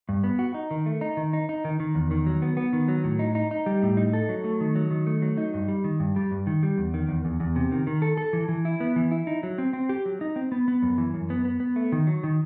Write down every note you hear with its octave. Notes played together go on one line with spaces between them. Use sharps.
G2
B3
F#4
D#4
D#3
A3
D#4
D#3
D#4
D#4
D#3
D#3
E2
D#3
F#3
B3
B3
D#3
F#3
A2
D#4
D#4
D#4
G3
A2
D#4
A4
F#3
A3
D#3
F#3
D#3
A3
F#3
D#4
G2
G3
D#3
G2
G3
G2
D#3
G3
E2
D#3
E2
E2
E2
C3
D#3
D#3
A4
A4
E3
E3
E4
B3
E3
E4
D#4
F#3
C4
C4
G4
F#3
D#4
C4
B3
B3
F#2
E3
F#2
B3
B3
B3
A3
D#3
F#3
D#3